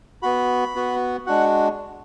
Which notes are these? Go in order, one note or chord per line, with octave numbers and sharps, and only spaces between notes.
B3 F#4 B5
B3 F#4
G#3 D4 F#4 F#5